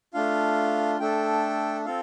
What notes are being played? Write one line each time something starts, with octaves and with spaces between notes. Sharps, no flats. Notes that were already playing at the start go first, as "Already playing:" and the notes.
A3 D4 F4 F5
A3 D4 A4 G5
C4 F4 A4 F5